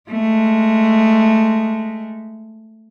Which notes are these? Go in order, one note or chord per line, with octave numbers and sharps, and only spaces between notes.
G#3 A3